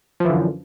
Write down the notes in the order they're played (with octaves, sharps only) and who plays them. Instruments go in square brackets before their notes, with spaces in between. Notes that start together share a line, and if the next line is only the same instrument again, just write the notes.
[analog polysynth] F3
E3
D3
F#2